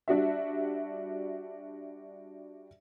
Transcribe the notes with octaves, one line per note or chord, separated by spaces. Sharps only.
G3 D4 F#4 E5